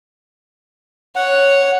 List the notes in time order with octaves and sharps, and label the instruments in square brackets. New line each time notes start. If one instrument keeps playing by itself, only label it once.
[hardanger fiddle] C#5 [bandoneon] F#5